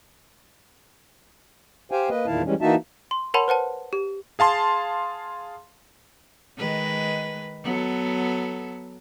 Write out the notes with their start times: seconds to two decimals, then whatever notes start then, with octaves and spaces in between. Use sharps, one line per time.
1.91 G4 C5 F5 G5 G#5
2.09 A#3 B4 D#5
2.26 E2 A#2 D#3 E4 F5 A5
2.44 E3 G3 G#3 C#4
2.61 E3 A#3 D#4 F#4 E5 A5
3.11 C6
3.34 A#4 C#5 F#5 A5 B5 C6
3.48 B4 C5 F#5 A5
3.93 G4
4.39 G#4 F5 A5 C6
6.58 D#3 G#3 B4
7.63 F#3 B3 A4